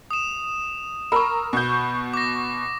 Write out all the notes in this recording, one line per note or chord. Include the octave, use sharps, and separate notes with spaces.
D#6 E7
A#4 B5 C#6 E6
B2 G6
D6 A#6